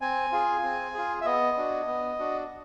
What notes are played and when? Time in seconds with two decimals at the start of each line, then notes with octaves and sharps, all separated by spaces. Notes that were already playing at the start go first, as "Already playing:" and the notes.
0.01 C4 G#5
0.32 F4 G#4
0.63 C4
0.94 F4 G#4
1.21 E5
1.25 B3 D#5
1.57 D4 F#4
1.87 B3
2.19 D4 F#4